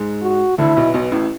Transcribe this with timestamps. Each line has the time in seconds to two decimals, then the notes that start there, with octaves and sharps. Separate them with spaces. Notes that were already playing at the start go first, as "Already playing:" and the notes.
Already playing: G#2 G#3
0.22 F#4
0.58 D2 D3 E4
0.76 B1 B2
0.94 B1 B2
1.12 A1 A2